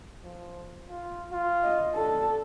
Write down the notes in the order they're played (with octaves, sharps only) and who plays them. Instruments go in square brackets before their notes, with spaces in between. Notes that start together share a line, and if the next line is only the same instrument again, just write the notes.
[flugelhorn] F3
F4
F4
[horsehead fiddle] D#5
[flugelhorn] D4 [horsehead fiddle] A4